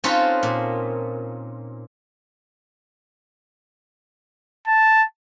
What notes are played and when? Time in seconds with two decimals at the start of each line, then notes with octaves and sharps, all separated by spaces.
0.04 C4 C#4 D#4 F4 A4 B4
0.43 A#2
4.67 A5